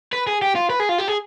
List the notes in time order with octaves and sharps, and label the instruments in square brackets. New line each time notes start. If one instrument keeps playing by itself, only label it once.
[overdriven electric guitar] B4
G#4
G4
F4
B4
G#4
F4
G4
G#4